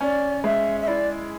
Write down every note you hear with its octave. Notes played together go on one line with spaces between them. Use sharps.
C#4 D5
G#3 E5
E5
E4 D5